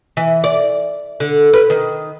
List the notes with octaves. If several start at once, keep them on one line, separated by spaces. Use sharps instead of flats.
E3
D5
D3
B4
D#3